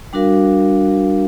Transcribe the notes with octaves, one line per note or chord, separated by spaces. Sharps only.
G3 D4 F#4 A#4 F5